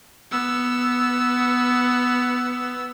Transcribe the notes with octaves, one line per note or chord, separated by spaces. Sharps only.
B3 E6